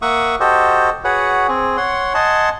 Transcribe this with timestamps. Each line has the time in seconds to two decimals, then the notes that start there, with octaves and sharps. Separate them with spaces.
0.02 A#3 E5 F#5 C#6 D#6
0.40 F#4 G4 A4 C5 D#5
1.04 F#4 G#4 B4 C#5 F#5
1.48 C4 G#4
1.77 C#5 F#5 C6
2.14 D#5 F#5 G#5 A5 C6